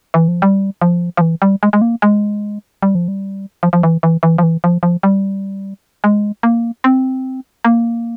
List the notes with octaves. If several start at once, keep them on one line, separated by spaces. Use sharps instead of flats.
E3
F3
G3
F3
F3
E3
G3
G#3
G#3
A#3
G#3
G3
F3
G3
F3
F3
E3
E3
E3
F3
E3
F3
F3
G3
G#3
A#3
C4
A#3